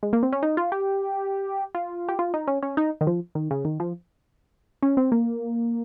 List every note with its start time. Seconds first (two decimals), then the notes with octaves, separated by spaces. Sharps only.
0.03 G#3
0.13 A#3
0.23 C4
0.33 C#4
0.43 D#4
0.57 F4
0.72 G4
1.75 F4
2.08 G4
2.19 F4
2.34 D#4
2.47 C#4
2.63 C#4
2.77 D#4
3.01 D#3
3.07 F3
3.35 D#3
3.51 C#3
3.65 D#3
3.80 F3
4.83 C#4
4.97 C4
5.12 A#3